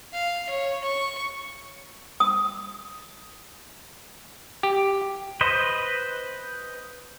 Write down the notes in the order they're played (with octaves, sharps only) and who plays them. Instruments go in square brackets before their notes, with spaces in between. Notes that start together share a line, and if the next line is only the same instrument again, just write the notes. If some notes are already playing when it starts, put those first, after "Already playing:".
[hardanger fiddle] F5
C#5
C#6
[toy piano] D#6
[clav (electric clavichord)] G4
[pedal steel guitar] B4 C5 D#5